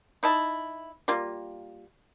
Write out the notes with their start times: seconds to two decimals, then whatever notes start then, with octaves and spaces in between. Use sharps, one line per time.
0.23 D#4 E4 A5
1.08 G3 A#3 F4